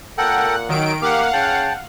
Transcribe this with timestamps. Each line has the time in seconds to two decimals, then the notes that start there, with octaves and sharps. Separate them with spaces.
0.18 A#2 A4 A#4 F#5 G5
0.69 D#3 F#3 D7
1.02 A#3 G4 F5 F#5 D6
1.33 C#3 G5 A5